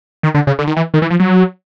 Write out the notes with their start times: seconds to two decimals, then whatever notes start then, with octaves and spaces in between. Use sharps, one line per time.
0.23 D#3
0.34 D3
0.47 C#3
0.59 D3
0.67 D#3
0.76 E3
0.94 D#3
1.02 E3
1.10 F3
1.20 F#3